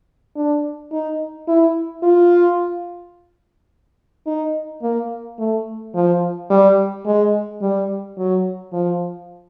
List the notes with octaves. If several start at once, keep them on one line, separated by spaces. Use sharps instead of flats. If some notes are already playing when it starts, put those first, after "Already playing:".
D4
D#4
E4
F4
D#4
A#3
A3
F3
G3
G#3
G3
F#3
F3